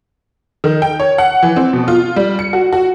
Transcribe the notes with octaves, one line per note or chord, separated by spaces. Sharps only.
D#3
G5
C#5
F#5
E3
C4
B2
F4
G3
C#7
F#4
F#4